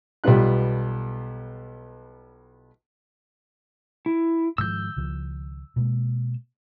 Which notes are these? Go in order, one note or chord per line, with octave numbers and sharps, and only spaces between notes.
B1 G3 B3 F4 F#6
E4
G#2 D#3 F3 E6 G6
C#2 D#3 F3
B2 G#3 A#3